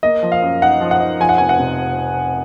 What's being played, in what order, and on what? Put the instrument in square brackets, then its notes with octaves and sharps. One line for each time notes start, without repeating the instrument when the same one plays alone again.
[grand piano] A#3 D#5
F3
F5
F#2
D#4 F#5
F3
F#5
D#4
F3 G#5
F#5
F1 G#5
F#5
C3